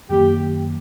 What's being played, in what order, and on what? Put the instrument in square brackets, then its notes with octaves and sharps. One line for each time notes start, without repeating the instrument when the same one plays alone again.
[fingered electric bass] F#2 D#3 F#3 A#3 [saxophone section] G4